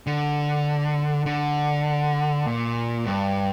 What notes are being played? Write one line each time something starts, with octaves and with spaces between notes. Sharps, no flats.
D3
D3
A#2
G2